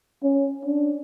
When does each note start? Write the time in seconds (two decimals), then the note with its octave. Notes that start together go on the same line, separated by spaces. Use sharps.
0.23 C#4
0.65 D4